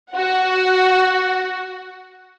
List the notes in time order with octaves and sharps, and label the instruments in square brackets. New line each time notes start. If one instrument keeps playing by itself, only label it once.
[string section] F#4 F#5